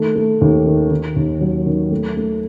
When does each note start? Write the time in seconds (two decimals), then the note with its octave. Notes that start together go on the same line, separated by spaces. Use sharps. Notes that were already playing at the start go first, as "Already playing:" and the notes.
Already playing: D#3 A3
0.16 A3
0.41 D#2
0.66 D#3
0.91 D#3
1.16 D#2
1.41 F#3
1.66 D#3
1.91 A3
2.17 A3